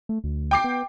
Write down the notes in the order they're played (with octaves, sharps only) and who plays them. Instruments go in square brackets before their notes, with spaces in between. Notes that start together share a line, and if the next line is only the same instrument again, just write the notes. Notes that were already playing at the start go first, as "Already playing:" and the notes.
[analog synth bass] A3
D2
[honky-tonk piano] G5 D6 C7
[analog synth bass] B3